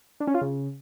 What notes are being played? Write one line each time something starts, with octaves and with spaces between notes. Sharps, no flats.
D4
C#4
F4
C#3